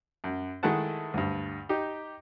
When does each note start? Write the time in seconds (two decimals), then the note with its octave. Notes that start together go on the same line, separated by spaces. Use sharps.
0.24 F#2
0.63 D#3 G#3 A3 E4 F#5 A5
1.14 D2 G2
1.69 D#4 G4